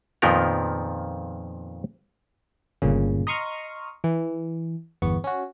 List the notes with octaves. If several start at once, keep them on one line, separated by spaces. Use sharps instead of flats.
F2 A#2 D#3 F3 B3 A#4
G1 A#2 C#3
D#5 A#5 C6 C#6 D#6 F6
E3
G1 E2 B3 C#6
C#4 F#4